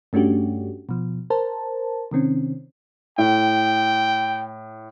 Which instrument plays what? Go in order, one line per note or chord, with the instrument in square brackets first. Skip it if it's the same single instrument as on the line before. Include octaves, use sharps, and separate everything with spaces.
[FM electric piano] G2 A3 C#4 D4 F#4 G4
B2 F3
A#4 C5 A5
C3 D#3 C4 C#4
[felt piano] A2 [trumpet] G5